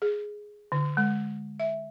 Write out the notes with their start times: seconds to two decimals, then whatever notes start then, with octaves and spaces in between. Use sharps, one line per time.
0.02 G#4
0.72 D3
0.97 G#3
1.60 E5